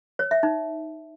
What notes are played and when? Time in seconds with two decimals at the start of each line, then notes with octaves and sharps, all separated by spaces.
0.19 C#5
0.31 E5
0.43 D#4